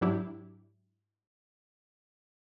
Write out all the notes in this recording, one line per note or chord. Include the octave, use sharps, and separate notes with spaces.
G#2 F#3 D4 E4 G4